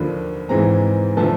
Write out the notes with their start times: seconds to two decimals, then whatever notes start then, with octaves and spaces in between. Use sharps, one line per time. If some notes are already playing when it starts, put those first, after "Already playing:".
Already playing: D#2 D3 F3 A#3 B5
0.49 G#2 E3 G#3 C4 A#5
1.17 D3 F3 A3 A5